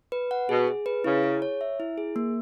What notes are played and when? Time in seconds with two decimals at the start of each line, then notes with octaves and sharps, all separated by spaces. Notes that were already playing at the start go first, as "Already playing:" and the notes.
0.12 B4
0.31 F#5
0.49 B2 G#4
0.68 G#4
0.86 B4
1.04 C#3 E4
1.23 G#4
1.42 C#5
1.61 E5
1.80 E4
1.98 G#4
2.16 A#3